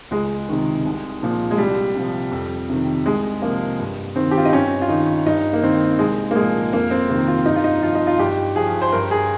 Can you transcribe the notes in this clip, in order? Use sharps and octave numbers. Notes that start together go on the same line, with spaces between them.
C#2 G#3
C3 D#3
C2
A#2 F3
G#3
C2 G3
C3 F3
F2
C3 D#3
C2 G#3
C3 F3 A#3
G2
D#3 C4
G4
F4
D#4
G2 C#4
F4
D#3 D#4
G2 D#4
A#3
D#3 C4
C2 G#3
A#3
A#2 F3 G#3
F2 A#3
C4
C3 D#3 A#3
F4
G2 D#4
F4
D#4
F3 F4
D#4
F4
G2 G4
F3 G#4
C5
G2 A#4
G#4